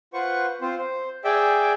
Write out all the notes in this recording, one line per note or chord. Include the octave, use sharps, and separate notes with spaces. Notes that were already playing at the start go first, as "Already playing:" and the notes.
F4 B4 C5 F#5 C#6
C4 F4 C5
C5
G#4 D5 E5 G5